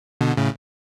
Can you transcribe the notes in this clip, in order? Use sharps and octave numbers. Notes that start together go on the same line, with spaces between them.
B2 D3
A2 C#3